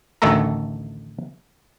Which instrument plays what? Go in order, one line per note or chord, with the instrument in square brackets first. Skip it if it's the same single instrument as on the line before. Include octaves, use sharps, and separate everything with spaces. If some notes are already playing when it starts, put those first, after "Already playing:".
[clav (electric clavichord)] A1 D2 D#3 A3 A4 A#5